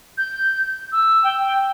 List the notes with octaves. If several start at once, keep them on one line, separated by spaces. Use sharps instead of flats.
G6
E6
G5